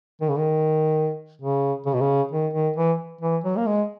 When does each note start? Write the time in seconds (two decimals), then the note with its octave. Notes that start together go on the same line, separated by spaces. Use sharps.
0.21 D#3
0.30 C#3
0.38 D#3
1.41 C#3
1.86 C#3
1.94 B2
2.01 C#3
2.31 D#3
2.53 D#3
2.76 E3
3.21 E3
3.44 F#3
3.57 A#3
3.66 G#3